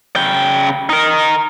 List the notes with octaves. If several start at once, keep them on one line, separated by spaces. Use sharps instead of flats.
C#3 G5
D#4 A#4